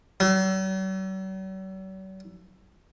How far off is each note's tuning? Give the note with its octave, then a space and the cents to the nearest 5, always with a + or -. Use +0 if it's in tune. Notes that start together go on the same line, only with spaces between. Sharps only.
F#3 +45